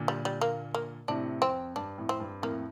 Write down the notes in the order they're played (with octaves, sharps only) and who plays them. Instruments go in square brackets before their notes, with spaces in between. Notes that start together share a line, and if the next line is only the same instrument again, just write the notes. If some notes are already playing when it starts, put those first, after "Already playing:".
Already playing: [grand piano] A#2 D3
[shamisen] G3
G3
A#3
A#3
[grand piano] A2 C3 [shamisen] D4
[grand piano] F2 [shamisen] C4
[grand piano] G2 [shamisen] D4
[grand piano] F2 A2
[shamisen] C4
[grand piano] G2
[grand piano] F2 A2 [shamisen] A#3